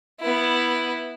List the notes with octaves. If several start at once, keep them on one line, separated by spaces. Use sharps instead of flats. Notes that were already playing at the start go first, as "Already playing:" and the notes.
B3 E4